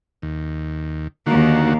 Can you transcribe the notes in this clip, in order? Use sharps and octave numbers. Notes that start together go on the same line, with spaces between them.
D#2
D#2 D3 D#3 A#3 F#4